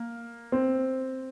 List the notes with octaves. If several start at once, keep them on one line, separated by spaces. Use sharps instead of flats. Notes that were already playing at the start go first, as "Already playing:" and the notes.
Already playing: A#3
C4